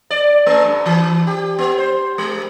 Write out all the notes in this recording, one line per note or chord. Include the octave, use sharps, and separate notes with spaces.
D5
A3
G2
E3
G4
B3
C5
G#3